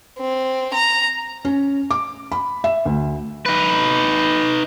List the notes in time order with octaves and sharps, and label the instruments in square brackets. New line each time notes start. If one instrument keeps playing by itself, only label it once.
[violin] C4
A#5
[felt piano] C#4
D6
B5
E5
D2
[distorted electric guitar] D#4 B4